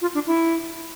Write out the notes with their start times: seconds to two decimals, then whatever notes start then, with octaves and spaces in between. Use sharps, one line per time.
0.01 F4
0.14 D4
0.27 E4